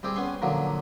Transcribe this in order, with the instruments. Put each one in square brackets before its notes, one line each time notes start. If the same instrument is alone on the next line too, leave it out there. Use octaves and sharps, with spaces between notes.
[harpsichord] G3 C4 G4 G#4
B3 C#4 G#5 C6
A#2 D3 F3 F#3